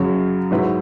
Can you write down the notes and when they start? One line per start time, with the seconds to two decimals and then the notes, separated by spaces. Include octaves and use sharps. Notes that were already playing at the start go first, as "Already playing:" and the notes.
Already playing: F#2 C#3 F#3
0.51 G#2 F#3 E4 B4